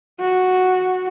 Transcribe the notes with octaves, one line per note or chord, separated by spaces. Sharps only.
F#4